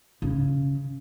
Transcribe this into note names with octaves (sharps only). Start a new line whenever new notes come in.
C#3